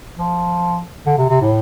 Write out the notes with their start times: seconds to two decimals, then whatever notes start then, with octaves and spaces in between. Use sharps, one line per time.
0.17 F3
1.06 D3
1.18 C3
1.29 C3
1.41 A2